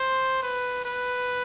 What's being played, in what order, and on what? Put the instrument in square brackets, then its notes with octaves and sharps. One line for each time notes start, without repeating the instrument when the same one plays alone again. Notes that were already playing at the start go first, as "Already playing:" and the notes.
Already playing: [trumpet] C5
B4
B4